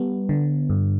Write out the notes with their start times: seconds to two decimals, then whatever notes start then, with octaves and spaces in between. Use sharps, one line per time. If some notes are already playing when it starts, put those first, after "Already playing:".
Already playing: G3 B3
0.29 D3
0.70 G2